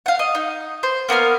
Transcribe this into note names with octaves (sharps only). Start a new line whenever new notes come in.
F5 F#5
D#5
D#4
C5
A#3 B3 A#4 F6